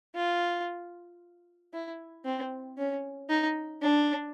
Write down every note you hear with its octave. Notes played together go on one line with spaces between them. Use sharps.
F4
E4
C4
C#4
D#4
D4